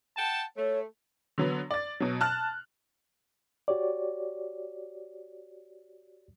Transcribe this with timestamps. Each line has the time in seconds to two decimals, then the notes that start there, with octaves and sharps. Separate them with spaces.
0.17 F#5 G5 A5
0.57 A3 C#5
1.38 D3 F#3 B3
1.71 D5 A6
2.00 B2 F#3
2.21 A5 F6 F#6
3.68 F#4 G4 C#5 D5